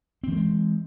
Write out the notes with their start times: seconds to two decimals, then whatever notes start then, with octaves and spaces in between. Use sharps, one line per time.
0.24 C4
0.28 E3
0.32 A3
0.36 G#3